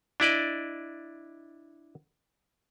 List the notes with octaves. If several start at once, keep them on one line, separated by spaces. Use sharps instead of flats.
D4 E4 D5 D#5